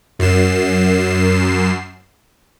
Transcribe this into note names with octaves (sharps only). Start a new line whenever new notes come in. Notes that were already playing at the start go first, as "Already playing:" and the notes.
F#2 C7 E7